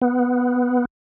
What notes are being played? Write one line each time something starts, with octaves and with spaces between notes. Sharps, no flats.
B3